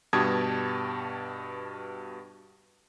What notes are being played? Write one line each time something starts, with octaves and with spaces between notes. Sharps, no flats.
G2 B2 G4 A5 D#6 G#6